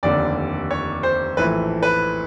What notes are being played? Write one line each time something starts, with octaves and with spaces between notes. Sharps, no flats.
F1 D#2 D3 D5
C#5
C5
A#1 A2 E3 A3 B4
B4